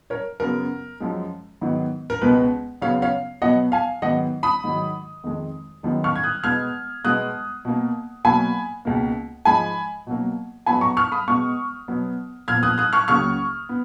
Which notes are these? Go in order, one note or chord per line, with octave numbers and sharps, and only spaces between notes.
A#4 C#5
F#2 C#3 F#3 B3 A#4
F#2 F3 G#3
G#2 D#3 F#3 B3
A#4
C#2 B2 G#3 B3 B4
F#2 C#3 F#3 B3 C#5 F5
C#5 F5
B2 F#3 B3 D#5 F#5
F5 G#5
G#2 D#3 F#3 B3 D#5 F#5
B5 D#6
G#2 D#3 F#3
F2 D#3 G#3
F#2 D#3 G#3 B3
C#6 F6
G#6
D#6 F#6
B2 G#3 B3 F6 G#6
B2 G#3 B3 D#6 F#6
B2 A#3
B2 F#3 A#3 G#5 B5
C#2 B2 A#3
G#2 F3 G#3 G#5 B5
B2 F#3 A#3
G#2 F#3 B3 G#5 B5
A#5 C#6
C#6 F6
B5 D#6
B2 G#3 B3 C#6 F6
B2 F#3 B3
A#2 F3 B3 F6 G#6
D#6 F#6
D#6 F#6
C#6 F6
C#2 C#3 F#3 A#3 C#6 F6
B3